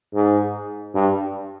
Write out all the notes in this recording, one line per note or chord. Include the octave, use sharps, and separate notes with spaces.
G#2
G2